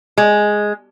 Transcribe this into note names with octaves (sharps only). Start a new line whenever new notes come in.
G#3